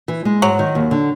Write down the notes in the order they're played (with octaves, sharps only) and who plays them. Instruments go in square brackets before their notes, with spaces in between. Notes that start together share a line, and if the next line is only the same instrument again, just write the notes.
[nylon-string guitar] E3
G#3
[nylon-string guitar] G#2 [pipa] F#3
[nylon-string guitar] D#3
D#2
D3